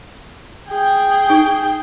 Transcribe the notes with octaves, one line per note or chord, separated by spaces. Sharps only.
G#4 G5
D#4